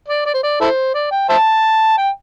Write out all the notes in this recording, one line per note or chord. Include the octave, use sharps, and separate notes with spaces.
D5
D5
C5
D5
E4 A4 C5
D5
G5
C5 E5 A5
G5